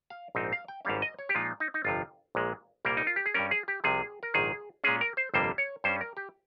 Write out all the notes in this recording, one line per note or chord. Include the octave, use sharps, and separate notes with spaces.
F5
A#1 G#2 F3 C4 D#4
F5
G5
G#1 G#2 G3 C#4 F5
D#5
C#5
G4
A#2 F3 G#3 D#4 F4
D#4
D#4
G1 F2 C3 F3 F4
A#1 A#2 G#3
C2 A#2 G3 A#3 A#4
D#4
F4
G4
G#4
G2 G3 C#4 A#4
G#4
G4
C2 C3 F3 G#4
A#4
A#1 G#2 D#3 G#4
A#2 G#3 C#4 G#4
A#4
C5
G1 F2 C3 G3 A#3 C5
C#5
G2 G3 C#4 C5
A#4
G4